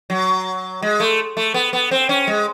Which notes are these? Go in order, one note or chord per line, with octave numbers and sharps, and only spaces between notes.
F#3
G#3
A3
A3
B3
B3
C4
C#4
G#3